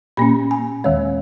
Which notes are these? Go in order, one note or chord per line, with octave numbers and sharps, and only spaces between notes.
A#2 A#3 C#4 B5
G#5
D#2 D#3 G#3 C#5